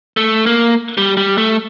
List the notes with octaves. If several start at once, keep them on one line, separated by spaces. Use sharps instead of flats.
A3
A#3
G3
G3
A3